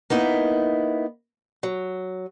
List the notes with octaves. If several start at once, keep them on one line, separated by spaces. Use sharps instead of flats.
A#3 B3 D#4 E4
F#3